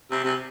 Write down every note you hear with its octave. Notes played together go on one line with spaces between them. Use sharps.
C3
C3